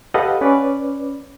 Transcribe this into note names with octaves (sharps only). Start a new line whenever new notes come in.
G4 A4 B4 D#5 F5 F#5
C#4 B4 D5